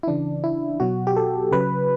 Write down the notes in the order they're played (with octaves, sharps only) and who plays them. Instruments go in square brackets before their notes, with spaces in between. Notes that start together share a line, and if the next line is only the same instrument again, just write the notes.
[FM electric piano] E4
C#3 E3 D4
E4
B2 F#3 F#4
G4
A4
C#3 F#3 B4